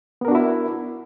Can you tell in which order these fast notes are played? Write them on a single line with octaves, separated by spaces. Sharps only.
B3 A#4 D4 F#4 E4